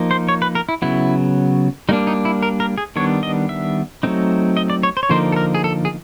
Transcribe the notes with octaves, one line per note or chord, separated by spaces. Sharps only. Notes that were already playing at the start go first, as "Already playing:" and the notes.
Already playing: F3 A#3 D#4
C5
C#5
B4
A#4
E4
C#3 F#3 B3 E4
G3 A#3 D4 D#4
D#4
E4
A#4
A#4
G#4
D#3 G3 B3 D4 C#5
D#5
E5
F#3 A3 C4 D#4
D#5
D5
C#5
C5
C#5
D3 F3 A#3 D#4 C5
A4
A#4
G#4
A4
G#4